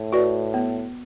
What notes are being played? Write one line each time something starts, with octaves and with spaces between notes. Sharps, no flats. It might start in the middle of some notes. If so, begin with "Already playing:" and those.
Already playing: A2
F#4 B4 D5
B3